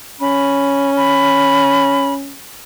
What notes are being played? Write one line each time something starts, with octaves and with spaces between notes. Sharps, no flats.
C#4 B5
B5